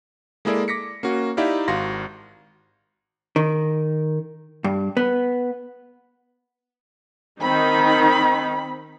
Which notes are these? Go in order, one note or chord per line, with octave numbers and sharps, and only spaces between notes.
G#3 A#3 E4 G#4 A4 D5
D6 A#6 B6 C#7
A#3 C#4 F#4
D#4 E4 G4 D5 E5 F5
G#1 F#4 F5 C6 A#6
D#3
G2
B3
D#3 C4 D#4 B5